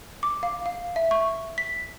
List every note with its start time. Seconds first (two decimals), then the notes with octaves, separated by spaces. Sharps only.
0.23 D6
0.43 F5
0.66 F5
0.96 E5
1.11 C#6
1.58 B6